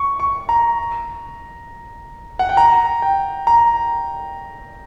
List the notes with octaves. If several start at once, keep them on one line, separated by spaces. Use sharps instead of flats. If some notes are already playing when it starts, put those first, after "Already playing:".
Already playing: C#6
C#6
A#5
F#5
G5
A#5
G5
A#5